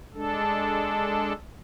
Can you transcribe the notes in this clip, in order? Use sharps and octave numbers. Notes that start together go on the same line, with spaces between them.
G#3 D4 A4